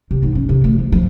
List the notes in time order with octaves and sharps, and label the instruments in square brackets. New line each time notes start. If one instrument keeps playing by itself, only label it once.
[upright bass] C3
G#2
C#4
C3
D2
F3
F3